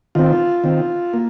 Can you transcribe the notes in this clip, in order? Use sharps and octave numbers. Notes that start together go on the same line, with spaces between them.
D#3 C4 F4
D#3 C4
A#3